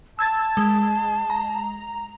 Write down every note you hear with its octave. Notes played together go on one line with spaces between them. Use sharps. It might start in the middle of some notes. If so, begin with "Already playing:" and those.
A5 E6 G#6 A6
G#3
A#5